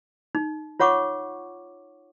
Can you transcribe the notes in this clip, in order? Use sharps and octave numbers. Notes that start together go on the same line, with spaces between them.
D#4
F4 C#5 F#5 C#6 D6